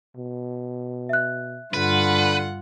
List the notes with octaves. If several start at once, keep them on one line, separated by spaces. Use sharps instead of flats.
B2
E5 F#6
G2 D3 F4 B4 F#5